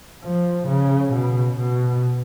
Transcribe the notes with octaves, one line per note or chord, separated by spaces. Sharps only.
F3
C#3
B2
B2